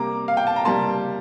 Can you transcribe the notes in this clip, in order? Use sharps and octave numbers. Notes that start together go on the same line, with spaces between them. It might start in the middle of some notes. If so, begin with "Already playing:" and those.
Already playing: C3 G3 A#3 A#5 D6
F5
G5
A5
A#5
C3 G3 A#3 A5 C6